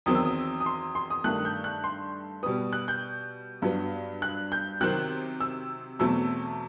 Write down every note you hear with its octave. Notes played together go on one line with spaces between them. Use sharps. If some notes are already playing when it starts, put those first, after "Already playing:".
E2 D#3 F#3 C4 D#6
E6
D#6
D#6
C6
C6
D#6
G2 D#3 A3 F#6
G6
F#6
C6
B2 G3 B3 D#6
F#6
G6
G2 F#3 B3
F#6
G6
C3 D#3 F#3 C4 F#6
E6
E2 B2 F#3 A3 C4 E6